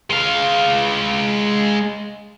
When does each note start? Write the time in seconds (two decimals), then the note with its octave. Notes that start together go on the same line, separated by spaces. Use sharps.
0.10 G#3 F5